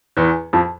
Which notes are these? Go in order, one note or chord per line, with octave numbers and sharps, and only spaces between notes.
E2 E3
F2 F3